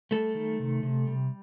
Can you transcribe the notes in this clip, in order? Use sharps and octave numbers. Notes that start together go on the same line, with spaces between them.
G3 A3 A4
D#3
C3
C3
G3